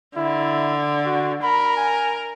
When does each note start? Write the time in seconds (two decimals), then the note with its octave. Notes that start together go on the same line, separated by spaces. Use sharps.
0.17 D3 E4
1.06 F#4
1.43 A#4 B5
1.76 G#5